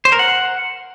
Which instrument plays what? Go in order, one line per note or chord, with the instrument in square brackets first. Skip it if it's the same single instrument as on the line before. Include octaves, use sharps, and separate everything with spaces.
[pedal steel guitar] C5
A#4
F#5